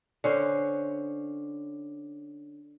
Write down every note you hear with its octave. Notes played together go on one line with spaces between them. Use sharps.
D3 C#4 C5